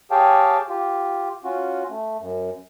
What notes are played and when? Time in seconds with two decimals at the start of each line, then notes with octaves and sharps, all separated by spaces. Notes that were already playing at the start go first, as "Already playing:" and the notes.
0.11 G4 G#4 C#5 F5 G5 A5
0.69 F4 G4
1.44 C#4 F4 F#4
1.89 A3
2.20 F#2